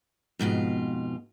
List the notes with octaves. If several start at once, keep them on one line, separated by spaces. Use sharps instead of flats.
F2 G#2 B2 F4